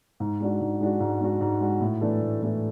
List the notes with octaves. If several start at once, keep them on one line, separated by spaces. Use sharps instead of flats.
G#2
G#3 D4 F#4
G#2
G#3 D4 F#4
G#2
G#3 D4 F#4
G#2
G#3 D4 F#4
A2
E3 A3 D4 A4
A2
E3 A3 D4 A4